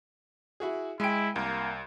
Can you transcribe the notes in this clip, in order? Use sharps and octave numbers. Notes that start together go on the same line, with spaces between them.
E4 F#4 G#4
G#3 E4 G5 G#5 D7
C2 A#3